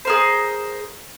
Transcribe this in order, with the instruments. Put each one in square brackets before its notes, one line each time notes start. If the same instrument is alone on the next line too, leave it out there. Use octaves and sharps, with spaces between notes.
[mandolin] G#4 A#4 C5